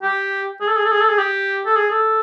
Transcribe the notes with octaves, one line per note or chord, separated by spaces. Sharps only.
G4
G#4
A4
G#4
A4
G#4
A4
G#4
G4
A4
G#4
A4